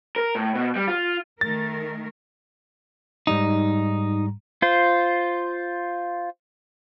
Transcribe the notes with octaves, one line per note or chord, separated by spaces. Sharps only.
A#4
A2
B2
G3
F4
D#3 A3 A#4 A6
G#2 G3 D#4 A#5
F4 C5